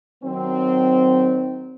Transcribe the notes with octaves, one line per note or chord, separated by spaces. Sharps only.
D#3 F#3 C4